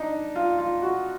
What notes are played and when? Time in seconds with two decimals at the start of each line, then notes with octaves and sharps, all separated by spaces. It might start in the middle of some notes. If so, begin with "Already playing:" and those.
Already playing: D4 D#4
0.36 F4
0.58 F4
0.82 F#4